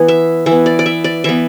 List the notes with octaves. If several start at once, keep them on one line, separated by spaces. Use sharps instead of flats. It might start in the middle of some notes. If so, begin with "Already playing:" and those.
Already playing: E3 B3
E5
E3 E5
B3
D5
D5
E5
D5
E3 B3 E5